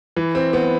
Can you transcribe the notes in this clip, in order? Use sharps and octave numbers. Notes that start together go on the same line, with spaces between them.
E3
C4
B3